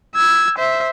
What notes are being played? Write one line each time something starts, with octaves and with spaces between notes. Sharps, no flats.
E6 G#6
C5 E5